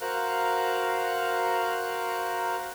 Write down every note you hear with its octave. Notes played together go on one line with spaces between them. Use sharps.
F#4 A#4 C5 F5 A#5 F#6